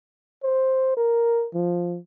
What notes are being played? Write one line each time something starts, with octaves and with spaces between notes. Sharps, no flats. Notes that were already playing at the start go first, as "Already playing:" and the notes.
C5
A#4
F3